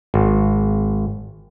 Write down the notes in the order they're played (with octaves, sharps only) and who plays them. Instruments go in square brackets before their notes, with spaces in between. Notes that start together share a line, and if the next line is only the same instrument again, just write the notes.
[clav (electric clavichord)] G#1